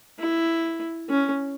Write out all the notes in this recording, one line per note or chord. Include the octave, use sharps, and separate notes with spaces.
E4
C#4